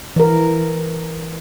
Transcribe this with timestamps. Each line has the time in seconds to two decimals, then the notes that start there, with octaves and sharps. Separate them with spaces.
0.16 E3 A#4